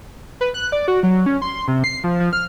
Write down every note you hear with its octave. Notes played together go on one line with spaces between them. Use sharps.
B4
F#6
D5
F#4
F#3
C#4
C6
C3
C7
F3
F3
F6